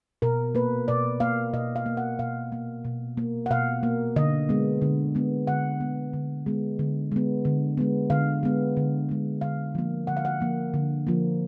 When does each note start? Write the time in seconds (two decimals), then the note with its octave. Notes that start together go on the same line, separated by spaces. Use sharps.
0.22 B2 A#4
0.55 A#3 B4
0.88 B2 D5
1.20 A#3 F5
1.54 B2 D#5
1.76 F5
1.86 A#3
1.97 F#5
2.19 B2 F5
2.52 A#3
2.85 B2
3.17 A#3
3.46 F#5
3.50 B2 F5
3.83 A#3
4.16 D3 D#5
4.49 G#3 B3
4.82 D3
5.15 G#3 B3
5.47 D3 F#5
5.80 G#3 B3
6.13 D3
6.46 G#3 B3
6.79 D3
7.12 G#3 B3
7.45 D3
7.77 G#3 B3
8.10 D3 F5
8.43 G#3 B3
8.77 D3
9.09 G#3 B3
9.41 D3 F5
9.75 F3 A#3
10.07 D3 F#5
10.17 F5
10.25 F#5
10.41 F3 A#3
10.74 D3
11.07 F3 A#3